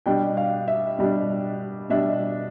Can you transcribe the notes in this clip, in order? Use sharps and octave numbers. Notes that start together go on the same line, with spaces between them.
B2 G3 D4 G5
F5
E5
B2 G3 D4
B2 G3 D4 E5